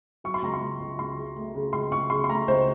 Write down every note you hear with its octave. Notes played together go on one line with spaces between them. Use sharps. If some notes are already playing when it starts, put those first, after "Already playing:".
F#3 C#6
C6
C#2 A#5
C6
C#2
C#2
C#2 C6
C#3
A3
C#3
C#2 C6
C#2 C#6
C#3 C6
C6
A3 A#5
C#2 C5